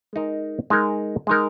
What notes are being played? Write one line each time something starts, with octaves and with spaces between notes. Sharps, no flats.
G#3 D#4 A#4
G#3 D#4 A#4
G#3 D#4 A#4